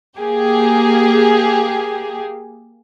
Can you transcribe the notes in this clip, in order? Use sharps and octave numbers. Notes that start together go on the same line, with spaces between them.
A#3 G4 G#4